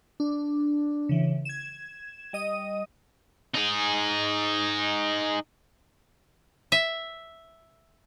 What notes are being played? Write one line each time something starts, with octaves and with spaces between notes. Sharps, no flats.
D4
C#3 E3
G#6 E7
G3 D#5 D#6 D#7
D#4 G#4
E5